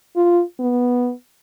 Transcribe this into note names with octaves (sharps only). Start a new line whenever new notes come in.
F4
B3